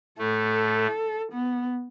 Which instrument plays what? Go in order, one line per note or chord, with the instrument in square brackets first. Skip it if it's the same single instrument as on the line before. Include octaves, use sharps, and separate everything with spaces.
[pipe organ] A2 A3 [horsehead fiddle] A4
[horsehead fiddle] B3